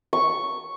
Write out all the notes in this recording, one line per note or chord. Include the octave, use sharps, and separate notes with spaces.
C#6